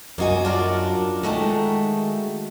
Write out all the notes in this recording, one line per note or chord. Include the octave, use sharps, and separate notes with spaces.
F#2 A#3 D#4 F#4 G#5
D4 F4 A#4
D#3 G#3 A3 D#4 F#4 A5